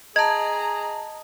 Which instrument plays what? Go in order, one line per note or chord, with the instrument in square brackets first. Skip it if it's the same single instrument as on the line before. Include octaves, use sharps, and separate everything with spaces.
[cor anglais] G#4 [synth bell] D#5 A5 [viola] A#5 [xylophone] G#6